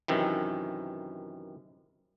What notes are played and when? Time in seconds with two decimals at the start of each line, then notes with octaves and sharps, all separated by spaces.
0.08 F#2 C3 D#3 E3